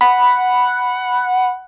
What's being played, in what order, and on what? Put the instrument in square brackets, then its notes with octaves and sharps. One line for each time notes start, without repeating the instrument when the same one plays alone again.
[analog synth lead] F#5 [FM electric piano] B5